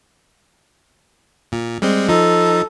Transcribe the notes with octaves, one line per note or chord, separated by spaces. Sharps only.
A#2
G3 G#3 C4
F3 D#4 A4